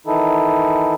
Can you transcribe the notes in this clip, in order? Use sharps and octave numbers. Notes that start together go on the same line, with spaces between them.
D#3 E3 D#4 E4 A4